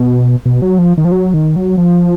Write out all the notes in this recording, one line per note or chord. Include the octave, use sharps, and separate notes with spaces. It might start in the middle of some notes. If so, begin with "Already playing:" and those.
Already playing: B2
B2
F#3
F3
D#3
F3
F#3
D#3
F#3
F3